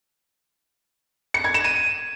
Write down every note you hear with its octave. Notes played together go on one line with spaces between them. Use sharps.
C#7
G#6
E7
D#7